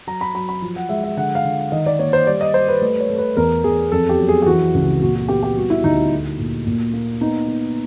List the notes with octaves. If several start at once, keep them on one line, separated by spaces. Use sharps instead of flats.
F#3 A#5
B5
F#3 B5
B5
F3
F#5
G#3 E5
E5
D3 F#5
F5
D3
D#3 D#5
D5
A#3 C#5
C5
G3 D5
D#5
G3 C5
B4
A3 B4
C#5
A3
B4
E2 A#4
E2 G#4
F2 A4
G4
F#3
G#4
G4
E3 F#4
C#2
A#2 F#4
F#4
B3 G4
G4
G3 F#4
E4
D2 D#4
A3
A#2
A#2
A#3
B3 D#4
B3